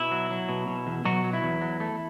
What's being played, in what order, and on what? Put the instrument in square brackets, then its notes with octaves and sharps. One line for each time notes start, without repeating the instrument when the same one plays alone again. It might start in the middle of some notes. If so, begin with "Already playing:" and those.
Already playing: [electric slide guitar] B2 E4
F#3
F#3
B2
B2
E2
B2 F#3 F#4
F#3
E4
E2
F#3
A3